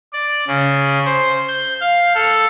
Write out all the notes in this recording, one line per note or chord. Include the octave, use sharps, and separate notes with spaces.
D5
C#3
C5
G6
F5
A4